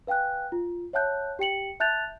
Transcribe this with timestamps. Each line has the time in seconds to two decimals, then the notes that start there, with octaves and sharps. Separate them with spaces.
0.07 B4 F5 G5 G#5 F#6
0.52 F4
0.93 C#5 E5 F#5 A5 F#6 G6
1.39 G4 G5 C#7 F#7
1.80 E5 A5 F#6 G6 A6 F7